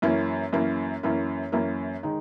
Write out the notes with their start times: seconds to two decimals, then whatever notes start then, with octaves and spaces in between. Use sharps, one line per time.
0.02 F#2 E3 A#3 C#4 E4
0.53 F#2 E3 A#3 C#4 E4
1.03 F#2 E3 A#3 C#4 E4
1.52 F#2 E3 A#3 C#4 E4
2.03 D#3 G#3 D#4